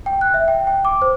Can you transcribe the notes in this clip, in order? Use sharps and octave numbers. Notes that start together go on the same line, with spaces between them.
G5
F#6
E5
G5
G5
D6
C5